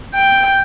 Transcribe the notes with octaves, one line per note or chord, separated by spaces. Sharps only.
G5